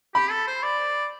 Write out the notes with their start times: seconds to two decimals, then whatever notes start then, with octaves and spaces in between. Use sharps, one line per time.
0.15 G4 B5
0.31 A4
0.47 C5
0.63 D5